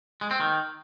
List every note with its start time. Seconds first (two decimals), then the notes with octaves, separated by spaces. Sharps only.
0.21 G#3
0.31 C4
0.40 D#3